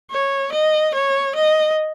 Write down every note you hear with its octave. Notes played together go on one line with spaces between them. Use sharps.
C#5
D#5
C#5
D#5